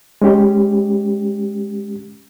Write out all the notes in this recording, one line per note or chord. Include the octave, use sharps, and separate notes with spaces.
G#3 C#4 G4